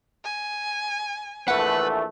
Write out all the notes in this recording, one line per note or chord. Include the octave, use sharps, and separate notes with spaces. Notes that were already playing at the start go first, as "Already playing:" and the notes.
G#5
A#1 E3 A3 B4 F#5